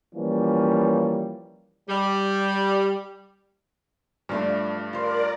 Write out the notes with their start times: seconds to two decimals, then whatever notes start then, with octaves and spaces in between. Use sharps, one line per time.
0.15 E3 F3 G3 A#3 C#4
1.89 G3
4.29 G2 F3 A3 D4
4.93 F4 A#4 C5 D5